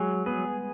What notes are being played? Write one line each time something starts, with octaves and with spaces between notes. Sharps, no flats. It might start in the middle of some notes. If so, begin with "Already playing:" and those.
Already playing: F#3 G#3 G#4
B3 G#4 B4